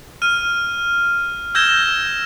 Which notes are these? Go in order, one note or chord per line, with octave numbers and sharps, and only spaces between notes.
F6 D#7
E6 G6 G#6 A#6 E7 G7